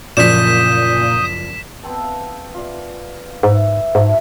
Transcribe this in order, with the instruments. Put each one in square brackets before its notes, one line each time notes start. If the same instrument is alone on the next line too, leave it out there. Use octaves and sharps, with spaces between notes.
[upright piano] F#1 F3 D5 [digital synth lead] A#2 [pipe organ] D#6 G6 [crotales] B6 E7
[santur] B3 C4 A5
F5 A5
F4 D5
[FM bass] G#2 [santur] B4 E5
[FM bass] G#2 [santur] F#3 A3 E4